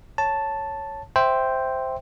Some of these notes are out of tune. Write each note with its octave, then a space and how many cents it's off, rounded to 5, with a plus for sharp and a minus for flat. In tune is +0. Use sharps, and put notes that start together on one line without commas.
C#5 +0 A5 +0
C5 +0 E5 -5 G5 +0